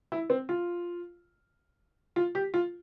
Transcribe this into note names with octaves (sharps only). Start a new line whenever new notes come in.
E4
C4
F4
F4
G4
F4